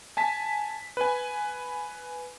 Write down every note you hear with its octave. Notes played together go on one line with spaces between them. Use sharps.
G#5 A5 B6
B4 G#5